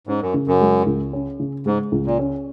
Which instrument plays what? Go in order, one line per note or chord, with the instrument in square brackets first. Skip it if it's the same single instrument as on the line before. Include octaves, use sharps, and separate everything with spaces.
[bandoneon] G#2 [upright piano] C#4
[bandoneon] F#2
[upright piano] C#3
[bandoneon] F#2
[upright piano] G#3
C#2
C#4
C#3
[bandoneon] G#2 [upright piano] G#3
[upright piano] C#2
[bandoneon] A#2
[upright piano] C#4